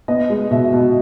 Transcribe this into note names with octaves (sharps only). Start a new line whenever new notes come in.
B3 D#5
G#3
B2 E5
B2